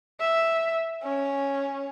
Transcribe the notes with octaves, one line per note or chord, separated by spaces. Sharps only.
E5
C#4